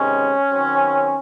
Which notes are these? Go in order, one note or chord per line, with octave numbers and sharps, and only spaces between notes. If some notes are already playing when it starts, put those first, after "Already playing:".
Already playing: C3 D#3 G#3 C#4
D#3 F#3 C4